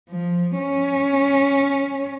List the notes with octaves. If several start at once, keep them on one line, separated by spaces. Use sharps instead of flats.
F3
C#4